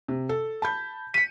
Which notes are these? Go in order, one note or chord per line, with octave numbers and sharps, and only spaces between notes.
C3
A4
A5 B5 G6
B6 C#7 D#7